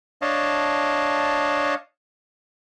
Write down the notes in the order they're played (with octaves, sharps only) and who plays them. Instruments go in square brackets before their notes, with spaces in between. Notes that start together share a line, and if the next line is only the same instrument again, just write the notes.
[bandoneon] D4 C#5 D#5 F5 A5